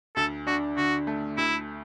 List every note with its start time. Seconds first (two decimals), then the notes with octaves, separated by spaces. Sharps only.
0.16 D2 A4
0.47 D4 F#4
0.77 D3 F#4
1.07 A3
1.38 D2 E4